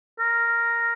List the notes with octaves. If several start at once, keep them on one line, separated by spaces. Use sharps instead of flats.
A#4